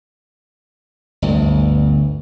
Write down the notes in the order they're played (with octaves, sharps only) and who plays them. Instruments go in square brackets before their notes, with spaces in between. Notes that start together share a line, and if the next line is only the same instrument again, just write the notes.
[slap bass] G1 D2